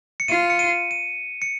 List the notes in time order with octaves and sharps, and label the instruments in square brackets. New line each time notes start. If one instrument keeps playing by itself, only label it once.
[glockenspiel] C#7
[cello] F4 [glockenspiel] D#7
[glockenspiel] C#7
D#7
D#7
C#7